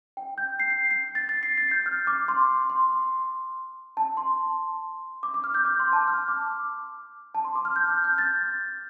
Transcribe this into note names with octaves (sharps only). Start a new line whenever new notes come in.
G5
G6
C7
C7
C7
A6
A6
C7
A6
G6
F6
D6
C6
C6
A5
C6
D6
D6
F6
G6
D6
C6
A5
F6
D6
A5
C6
D6
F6
G6
F6
G6
A6